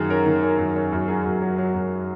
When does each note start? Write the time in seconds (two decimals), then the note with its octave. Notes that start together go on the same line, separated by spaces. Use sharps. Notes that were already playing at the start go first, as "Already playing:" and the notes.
Already playing: F#2 D#3 G#4
0.10 C#4 A#4
0.26 D#3
0.43 C#4
0.58 F#2
0.76 C#4
0.92 F#2
1.08 F#3 G#4
1.25 F#2
1.42 F#3
1.58 F#3
1.74 F#2